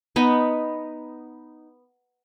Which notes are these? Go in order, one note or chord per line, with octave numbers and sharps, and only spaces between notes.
B3 D#4 D#5 B5